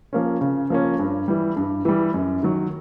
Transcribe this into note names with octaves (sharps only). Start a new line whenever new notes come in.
F3 A#3 C#4
C#3
F3 A#3 C#4
G2
E3 G3
G2
E3 G3
F#2
D#3 F#3